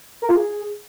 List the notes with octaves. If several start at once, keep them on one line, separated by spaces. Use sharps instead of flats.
A#4
F4
G#4